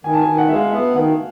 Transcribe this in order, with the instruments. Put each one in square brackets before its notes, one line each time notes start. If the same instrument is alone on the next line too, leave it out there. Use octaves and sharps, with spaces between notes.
[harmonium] D#3 [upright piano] G#5
[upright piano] A5
G#5
[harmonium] D#3
[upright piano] F#5
[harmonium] G#3 [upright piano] E5
[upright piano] F5
[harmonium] B3 [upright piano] E5
[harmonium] D#3 [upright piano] F#5